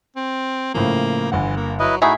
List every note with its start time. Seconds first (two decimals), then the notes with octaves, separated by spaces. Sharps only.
0.16 C4
0.74 A2 C#3 F3 A#3
1.32 G1 E3 F#5
1.57 A#3
1.80 F#3 E4 B4 D#5
2.02 A2 D#4 E4 F#4 G#4 E5